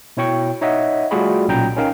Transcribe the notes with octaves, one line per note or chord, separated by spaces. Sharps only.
B2 E4 C#5 G5 C#6
D#4 C#5 D#5 E5 F#5
G3 A3 F4 F#4 G#4 B5
B1 A#2 C#4 G5 A#5 G6
C#4 D#4 A#4 F5 G5